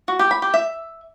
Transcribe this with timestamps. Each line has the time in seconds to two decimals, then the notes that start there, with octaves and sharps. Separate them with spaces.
0.08 F#4
0.19 G4
0.31 B5
0.42 G4
0.54 E5